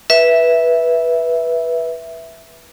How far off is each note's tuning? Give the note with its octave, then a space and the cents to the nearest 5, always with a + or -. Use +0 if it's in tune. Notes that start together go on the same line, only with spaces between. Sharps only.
B4 -15 E5 +0